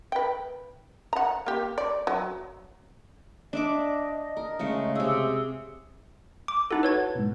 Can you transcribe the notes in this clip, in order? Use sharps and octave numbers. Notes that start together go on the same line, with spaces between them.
B4 G5
F#5 A#5
A#3 G4
D5
F#3
D4 D#5 E5 D6
A#4
C#3 G#3 A3
C3 G#4 E6
D6
D#4 E4 F#4 A4 F#5 A5
B4 C#5 G#6
G#2 B2